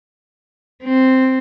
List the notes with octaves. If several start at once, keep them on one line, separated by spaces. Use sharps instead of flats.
C4